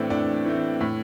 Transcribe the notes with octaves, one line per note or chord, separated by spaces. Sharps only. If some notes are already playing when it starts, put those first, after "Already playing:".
Already playing: A2 E3 A3 C4 D4
A2 D4
E3 A3 C4
A2